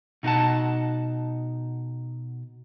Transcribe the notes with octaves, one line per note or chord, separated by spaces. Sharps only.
B2 D#4 F4 F#5 A5